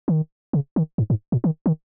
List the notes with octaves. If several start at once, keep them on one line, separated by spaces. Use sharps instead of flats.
D#3
C#3
D#3
G#2
G#2
A#2
D#3
D#3